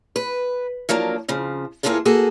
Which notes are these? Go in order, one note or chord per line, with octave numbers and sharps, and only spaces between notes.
B4
F3 F#3 A#3 D4
F2 C#3 F3
E2 B2 A#3 F4 G#4 A4
A#3 F#4 G#4 A4